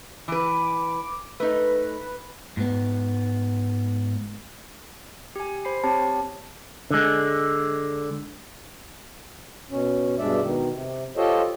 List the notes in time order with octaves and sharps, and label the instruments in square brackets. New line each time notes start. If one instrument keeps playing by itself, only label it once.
[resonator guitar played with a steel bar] E3 B4 [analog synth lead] D6
[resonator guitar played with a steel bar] A3 D#4 [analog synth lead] B4
[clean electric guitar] G#2 B3
[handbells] G4 G#5
C5 B5 C7
[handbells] C4 G4 C#5 [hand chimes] A5
[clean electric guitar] D3 G#3
[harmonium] B2 C#4
G2 B2 G#3 D4 D5 E5
B2 D#3
C3
F4 G4 A4 C5 C#5 D#5